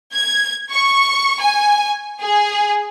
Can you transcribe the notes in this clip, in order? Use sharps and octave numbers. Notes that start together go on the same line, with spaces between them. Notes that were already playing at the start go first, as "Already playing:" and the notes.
G#6
C#6
G#5
G#4